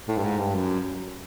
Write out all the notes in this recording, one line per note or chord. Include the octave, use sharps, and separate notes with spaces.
A2
G2
G#2
G2
F#2